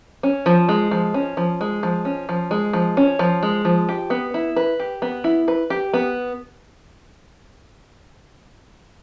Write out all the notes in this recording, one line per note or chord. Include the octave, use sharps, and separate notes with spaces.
C#4
F3
G#3
F3
C#4
F3
G#3
F3
C#4
F3
G#3
F3
C#4
F3
G#3
F3
G4
B3
E4
B4
G4
B3
E4
B4
G4
B3